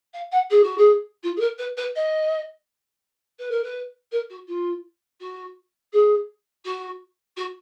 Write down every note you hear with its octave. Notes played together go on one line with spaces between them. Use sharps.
F5
F#5
G#4
F#4
G#4
F4
G#4
A#4
B4
B4
D#5
B4
A#4
B4
A#4
F#4
F4
F#4
G#4
F#4
F#4